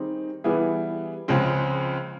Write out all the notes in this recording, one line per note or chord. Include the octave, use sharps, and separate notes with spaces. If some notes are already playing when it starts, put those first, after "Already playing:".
Already playing: D#3 G3 C4 D#4 G#4
E3 G3 B3 E4 G#4
C#2 C#3 F3 G#3 C4